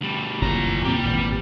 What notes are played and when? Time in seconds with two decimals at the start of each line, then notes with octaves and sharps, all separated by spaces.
0.01 D2 G3
0.42 F#1 F2 A#2 E3 A#5
0.85 E2 A#2 G3 C4 G4
1.01 G#1 A#2 E3